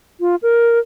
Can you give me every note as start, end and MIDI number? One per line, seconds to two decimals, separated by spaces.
0.20 0.35 65
0.42 0.79 70